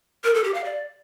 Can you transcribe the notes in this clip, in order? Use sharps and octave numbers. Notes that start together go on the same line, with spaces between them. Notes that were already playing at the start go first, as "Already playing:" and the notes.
A#4
A4
G4
F5
D5